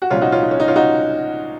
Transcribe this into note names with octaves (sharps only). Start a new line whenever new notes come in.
F#4
C2 A#2 F3 C#4 F4
D#4 F#4
C#4 F4
D#4
C#4
D#4
C#4 F4
D#4 F#4